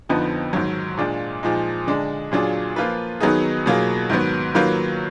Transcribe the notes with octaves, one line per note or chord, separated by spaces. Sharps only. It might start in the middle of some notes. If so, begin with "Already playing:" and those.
F2 D3 F3 B3 D#4
G#2 D#3 F#3
A#2 G#3 D4 F4
A#2 F3 G#3 D#4
D3 G#3 D4
A#2 F#3 D4 F4 G#4
F3 A#3 F4 B4
D#3 F#3 B3 D#4 G#4
B2 F#3 A#3 F4 G#4
G#2 D#3 F#3 B3
D#3 F#3 A#3 F4 B4